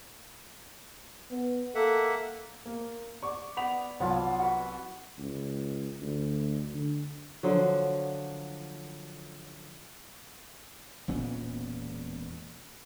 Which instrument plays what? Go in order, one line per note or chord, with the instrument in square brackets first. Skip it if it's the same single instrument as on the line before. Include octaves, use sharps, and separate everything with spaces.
[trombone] B3
[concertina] A#3 E5 F#5 [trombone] A4
[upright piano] A#3
[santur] D5 [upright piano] C#6
[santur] B3 [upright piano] C#6 B6 F7
[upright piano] C2 F#3 F#5 [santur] B3 F4 A5
[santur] F#4 B4
[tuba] C#2
D2
D3
[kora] D3 F3 F#3
[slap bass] E1 A#2 B3 C#4